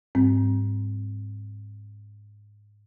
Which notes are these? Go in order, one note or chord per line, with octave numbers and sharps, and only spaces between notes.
G#2 G3 C4